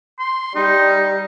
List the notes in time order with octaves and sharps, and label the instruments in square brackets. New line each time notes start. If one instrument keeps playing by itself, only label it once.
[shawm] C6
[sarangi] G3 [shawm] D#4